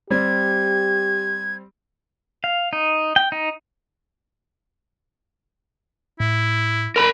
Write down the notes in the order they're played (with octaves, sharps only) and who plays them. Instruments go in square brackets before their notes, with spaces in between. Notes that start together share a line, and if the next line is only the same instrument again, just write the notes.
[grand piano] G3 C4 [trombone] G4 [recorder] G#6
[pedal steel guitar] F5
D#4
G5
D#4
[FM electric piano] A2 [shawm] E4
[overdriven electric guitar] A#4 B5